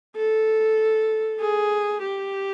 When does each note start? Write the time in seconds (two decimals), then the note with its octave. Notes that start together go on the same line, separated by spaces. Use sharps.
0.16 A4
1.40 G#4
2.03 G4